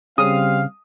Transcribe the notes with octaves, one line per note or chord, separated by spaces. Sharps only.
C#3 G3 C4 F5 D#6